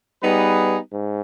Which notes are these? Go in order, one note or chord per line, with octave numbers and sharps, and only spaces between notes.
G3 B3 D#4 G#4 B4
G#2